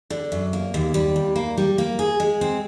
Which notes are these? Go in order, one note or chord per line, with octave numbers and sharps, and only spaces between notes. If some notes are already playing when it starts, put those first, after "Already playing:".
D3
F#2
A#3
D#2
G3
D#2
A#3
G3
A#3
G#4
G#3
C4